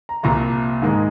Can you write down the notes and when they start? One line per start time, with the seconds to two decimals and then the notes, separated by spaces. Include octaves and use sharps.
0.09 A#5
0.23 C2 A#2 F3 A#5
0.82 G#2 D#3 G#3